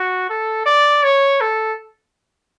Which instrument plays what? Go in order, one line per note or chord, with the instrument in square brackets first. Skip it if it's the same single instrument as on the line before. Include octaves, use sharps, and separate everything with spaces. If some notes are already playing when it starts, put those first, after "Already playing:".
Already playing: [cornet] F#4
A4
D5
C#5
A4